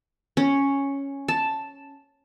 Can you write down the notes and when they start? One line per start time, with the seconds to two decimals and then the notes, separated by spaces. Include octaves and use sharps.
0.37 C#4
1.28 A5